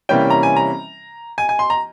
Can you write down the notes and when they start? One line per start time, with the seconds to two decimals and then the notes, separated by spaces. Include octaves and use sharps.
0.09 C3 E3 G3 A#3 C#4 G5
0.30 A#5
0.43 G#5
0.56 A#5
1.38 G#5
1.49 G#5
1.59 C6
1.70 A#5